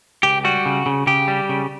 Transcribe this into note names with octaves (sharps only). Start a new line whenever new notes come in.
C#2 G4
G3 F#4
C#3
C#3
C#3 G4
G3
C#3